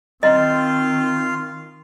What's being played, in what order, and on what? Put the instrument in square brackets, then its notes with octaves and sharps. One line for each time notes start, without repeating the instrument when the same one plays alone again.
[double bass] D#3 [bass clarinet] C4 [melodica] F4 [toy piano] D#5